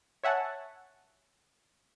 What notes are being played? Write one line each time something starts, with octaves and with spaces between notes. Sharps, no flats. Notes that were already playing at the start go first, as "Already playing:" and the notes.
C#5 E5 F#5 G#5 A5